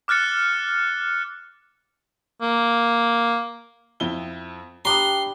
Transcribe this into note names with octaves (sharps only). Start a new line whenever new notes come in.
D6 F6 F#6 A6 C#7
A#3
F2 E4 G7
G3 D4 G4 A#5 C6 D6 D#6